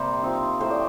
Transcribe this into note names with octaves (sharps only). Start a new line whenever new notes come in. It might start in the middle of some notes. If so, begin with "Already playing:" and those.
Already playing: C3 G3 A#3 C5
F3 C4 D#4
A2 A3 D#4 C5
D5